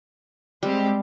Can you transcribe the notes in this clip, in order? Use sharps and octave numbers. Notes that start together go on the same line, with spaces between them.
G3 G#3 C4 G4